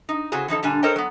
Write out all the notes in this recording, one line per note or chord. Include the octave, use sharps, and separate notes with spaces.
D#4
C#3 C4 E4 F#4 G#4
E3 F3 D#4 A4
A#2 D3 G3 D4 G#5
A4 A#4 C5 C#5 D#5 G5
F#3 B3